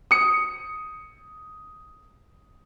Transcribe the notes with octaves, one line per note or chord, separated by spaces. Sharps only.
D#6 C#7